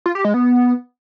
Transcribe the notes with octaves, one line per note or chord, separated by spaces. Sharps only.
F4
G4
G#3
B3